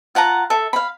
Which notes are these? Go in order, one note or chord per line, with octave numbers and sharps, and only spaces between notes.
F4 F#5 A5 A#5
A4 E5
F5 B5